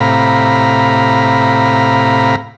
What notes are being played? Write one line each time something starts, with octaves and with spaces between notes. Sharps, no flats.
A2 C3 F5 A#5 B5